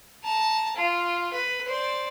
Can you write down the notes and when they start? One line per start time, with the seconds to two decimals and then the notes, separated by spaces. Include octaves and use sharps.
0.24 A5 A#5
0.76 F4
1.33 B4
1.68 C5 D5